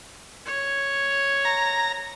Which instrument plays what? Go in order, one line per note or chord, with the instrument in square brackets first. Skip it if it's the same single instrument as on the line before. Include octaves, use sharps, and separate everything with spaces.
[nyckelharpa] C#5
[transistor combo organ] A#5